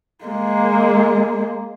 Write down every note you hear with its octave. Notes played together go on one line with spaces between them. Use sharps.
G#3 A#3